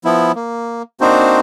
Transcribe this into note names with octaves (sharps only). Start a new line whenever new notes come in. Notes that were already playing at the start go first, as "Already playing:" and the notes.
F3 B3 E4
A#3
A#3 C4 D4 D#4 F#4 C5